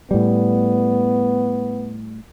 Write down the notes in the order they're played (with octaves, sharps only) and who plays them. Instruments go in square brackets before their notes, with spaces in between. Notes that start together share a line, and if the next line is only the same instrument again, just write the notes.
[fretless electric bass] A2 G3 [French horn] B3